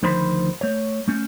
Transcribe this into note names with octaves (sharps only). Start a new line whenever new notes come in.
D2 D#3 F3 C5 B5 C6
A3 C#5
A3 C#4